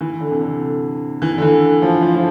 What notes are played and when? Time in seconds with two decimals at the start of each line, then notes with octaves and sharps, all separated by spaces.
0.01 E3
0.20 D3
0.31 C3
0.41 D3
1.22 E3
1.38 D3
1.42 E3
1.82 F3
2.02 F3
2.15 F3